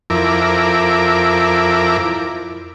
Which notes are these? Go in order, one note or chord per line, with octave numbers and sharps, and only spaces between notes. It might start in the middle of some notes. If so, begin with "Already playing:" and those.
F2 E4 A#4 D6